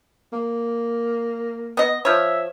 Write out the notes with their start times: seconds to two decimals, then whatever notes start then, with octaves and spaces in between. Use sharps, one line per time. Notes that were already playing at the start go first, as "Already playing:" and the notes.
0.33 A#3
1.77 B3 D#5
2.05 F3 C#5 E5